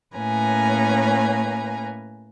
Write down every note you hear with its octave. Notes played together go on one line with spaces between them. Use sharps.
A2 A#3 C#4 B4 G#5 A#5